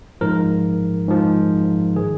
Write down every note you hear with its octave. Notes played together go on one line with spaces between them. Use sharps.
G#2 F3 A#4
G#2 F3
D#3 G#4